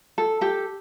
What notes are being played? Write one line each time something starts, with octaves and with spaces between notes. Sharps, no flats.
A4
G4 A4